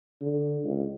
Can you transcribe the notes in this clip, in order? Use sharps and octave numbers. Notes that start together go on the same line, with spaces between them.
D3
C#2